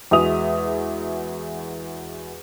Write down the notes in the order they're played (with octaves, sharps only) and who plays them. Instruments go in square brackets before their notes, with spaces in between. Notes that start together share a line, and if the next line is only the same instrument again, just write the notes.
[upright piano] E2 G#3 F#4 E5 D#6 F7